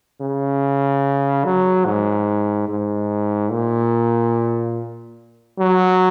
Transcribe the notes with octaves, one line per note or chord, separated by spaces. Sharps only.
C#3
F#3
G#2
G#2
A#2
F#3